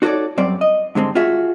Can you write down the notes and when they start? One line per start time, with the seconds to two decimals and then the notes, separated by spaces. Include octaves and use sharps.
0.02 D#4 F#4 A4 A#4 C#5 D5
0.38 F#2 G3 C4 D5
0.61 D#5
0.95 G2 D3 G#3 C4
1.15 F4 F#4 G#4 E5